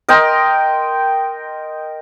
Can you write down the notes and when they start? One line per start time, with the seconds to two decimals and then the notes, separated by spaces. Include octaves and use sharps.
0.09 A#4 D#5 G5 C6